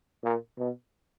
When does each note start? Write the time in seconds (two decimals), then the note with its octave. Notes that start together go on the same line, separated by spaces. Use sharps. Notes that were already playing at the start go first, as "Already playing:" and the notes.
0.23 A#2
0.59 B2